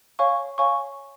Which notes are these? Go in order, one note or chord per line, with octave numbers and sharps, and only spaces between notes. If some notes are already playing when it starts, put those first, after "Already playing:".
C#5 F5 G#5 C#6
C#5 F5 G#5 C#6